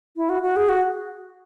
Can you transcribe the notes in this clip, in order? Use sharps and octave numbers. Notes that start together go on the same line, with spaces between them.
E4
F#4
F#4
G#4
F#4